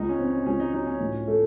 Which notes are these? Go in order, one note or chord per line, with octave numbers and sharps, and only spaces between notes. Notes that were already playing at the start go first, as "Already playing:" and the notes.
Already playing: C#2 D#4
C#4
C4
C#4
C#2 C#4
D#4
F#3 D#4
C#4
A2
A3